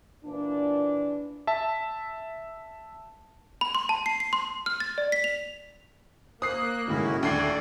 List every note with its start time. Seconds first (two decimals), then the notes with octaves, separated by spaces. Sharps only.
0.25 A#2 E3 D4
1.47 E5 A5
3.61 B5
3.75 C6
3.89 A5
4.06 C7
4.20 C7
4.33 C6
4.66 F6
4.80 A6
4.98 D5
5.12 B6
5.24 F7
6.42 A#3 C5 D#6 F#6 C7
6.88 G#1 A2 C#3 C#4 E4 F#4
7.23 D#1 D2 A3 A4 D5 G#6 C7